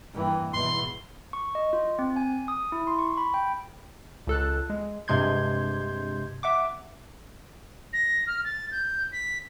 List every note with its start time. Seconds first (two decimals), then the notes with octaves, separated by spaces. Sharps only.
0.14 G2 E3 A#3 C4 F#5 G5
0.53 E2 G2 B2 E3 F#3 G#3 C#4 C6
1.33 C#6
1.55 D#5
1.73 F4
1.99 C4
2.16 G#5
2.48 D#6
2.72 E4
2.87 C6
2.99 C#6
3.17 B5
3.34 G5
4.27 C#2 A4 F#6
4.70 G#3
5.08 G2 C3 G#3 C6 G6 G#6
6.43 E5 F#5 D6
7.93 A#6
8.27 F6
8.44 A6
8.71 G6
9.12 B6